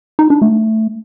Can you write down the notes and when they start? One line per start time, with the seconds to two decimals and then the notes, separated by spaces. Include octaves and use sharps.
0.19 D#4
0.30 D4
0.42 A3